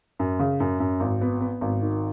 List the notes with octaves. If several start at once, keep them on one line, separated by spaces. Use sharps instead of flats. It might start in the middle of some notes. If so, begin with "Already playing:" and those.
F#2
C#3
F#2
F#2
G#1
B3
B3
G#1
D#3